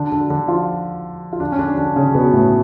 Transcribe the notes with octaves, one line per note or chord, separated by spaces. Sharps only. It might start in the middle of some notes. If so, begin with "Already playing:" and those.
Already playing: D3 D4
D3 D4
D3 D4
F3 F4
F4
D3 D4
C#4
D3 D4
D3 D4
C#3 C#4
B2 B3
A2 A3